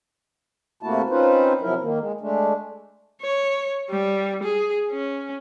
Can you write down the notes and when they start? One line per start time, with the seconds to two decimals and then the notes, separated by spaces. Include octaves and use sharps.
0.83 C3 A3 A#3 E4 F#4 A5
1.10 C4 C#4 D#4 F4 B4 C5
1.61 C3 F3 F#3 E4 A#4
1.81 D#3 A#3
1.99 G#3
2.21 G#3 A3 D4
3.22 C#5
3.90 G3
4.43 G#4
4.91 C#4